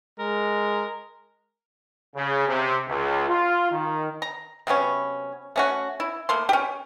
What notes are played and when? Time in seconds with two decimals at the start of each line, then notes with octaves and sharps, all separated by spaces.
0.20 G#3 A#4
2.16 C#3
2.47 C3
2.87 C#2
3.28 F4
3.70 D#3
4.22 A#5
4.67 C3 F#3 B3 C#4
5.56 A3 C#4 F#4
6.00 E4
6.29 A3 A#3 C6
6.49 C#4 G4